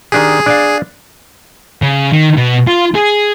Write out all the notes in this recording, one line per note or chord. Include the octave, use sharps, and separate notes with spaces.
D#3 D4 G4 G#4
D4 D5 F5
C#3
D#3
B2
F4
G#4